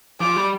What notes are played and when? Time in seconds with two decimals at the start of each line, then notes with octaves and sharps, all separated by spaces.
0.20 F3 D6
0.36 G3